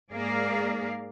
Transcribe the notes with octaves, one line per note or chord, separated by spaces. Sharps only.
G#2 A#3 G#4 A#4 D5 F5